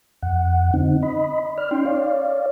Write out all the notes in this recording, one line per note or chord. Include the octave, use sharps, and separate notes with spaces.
F2 F#5
D3 C4 D#4
D#5 B5
D5 F6
C#4 D#4 G5 C6
C#5 D5 F5